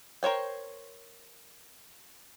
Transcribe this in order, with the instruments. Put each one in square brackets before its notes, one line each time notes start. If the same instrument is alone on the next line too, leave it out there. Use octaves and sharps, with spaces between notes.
[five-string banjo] A#4 C5 C#5 G5